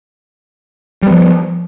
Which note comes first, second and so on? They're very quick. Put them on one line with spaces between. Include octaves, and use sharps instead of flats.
G3 B3 F3